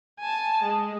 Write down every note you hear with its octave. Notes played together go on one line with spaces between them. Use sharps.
G#5 A5
G#3